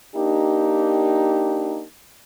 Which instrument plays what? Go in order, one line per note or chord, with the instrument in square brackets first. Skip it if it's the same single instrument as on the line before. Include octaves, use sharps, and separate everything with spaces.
[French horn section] A#3 D4 D#4 G4